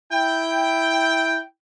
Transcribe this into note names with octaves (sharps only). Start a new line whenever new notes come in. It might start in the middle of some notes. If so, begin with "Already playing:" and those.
E4 G5